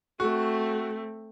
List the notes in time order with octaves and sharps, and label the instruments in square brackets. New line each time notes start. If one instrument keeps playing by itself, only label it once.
[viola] A3 C4 [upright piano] F#4